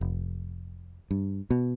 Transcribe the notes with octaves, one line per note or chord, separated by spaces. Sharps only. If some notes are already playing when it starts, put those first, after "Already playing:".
F1
G2
B2